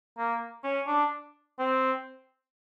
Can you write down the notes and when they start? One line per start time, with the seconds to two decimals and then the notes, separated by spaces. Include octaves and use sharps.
0.18 A#3
0.64 C#4
0.87 D4
1.59 C4